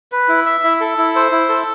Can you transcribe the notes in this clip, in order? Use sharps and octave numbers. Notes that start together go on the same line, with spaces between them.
B4
E4
E5
E4
A4
E4
C5
E4
A4